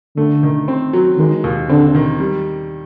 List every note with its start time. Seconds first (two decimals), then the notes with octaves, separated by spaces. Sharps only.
0.17 D3 A3
0.43 D#3
0.68 C4
0.93 F#3
1.18 D#3 G#3
1.44 D#2
1.69 D3 C4
1.95 D#3
2.20 G3